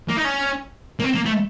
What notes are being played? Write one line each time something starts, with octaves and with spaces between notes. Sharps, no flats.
A#3
D#4
C#4
A#3
C4
A#3
A3